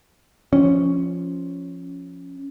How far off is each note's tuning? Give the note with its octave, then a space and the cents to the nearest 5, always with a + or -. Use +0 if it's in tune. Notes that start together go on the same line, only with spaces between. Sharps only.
F3 +0 C#4 +0